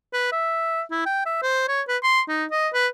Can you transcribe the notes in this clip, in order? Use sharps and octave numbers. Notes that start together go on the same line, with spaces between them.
B4
E5
E4
G5
E5
C5
C#5
B4
C6
D#4
D#5
B4